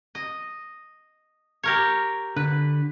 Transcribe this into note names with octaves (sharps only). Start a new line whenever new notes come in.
D#5
G4 A#4 C#5
D3 B4